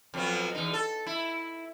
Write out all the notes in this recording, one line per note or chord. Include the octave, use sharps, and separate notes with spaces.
F2 F#3 B3
E2 D#4
A4
E4